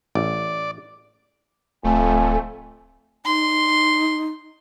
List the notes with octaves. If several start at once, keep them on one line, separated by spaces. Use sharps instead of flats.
A1 D5
D1 F2 A3 G#5
D#4 C6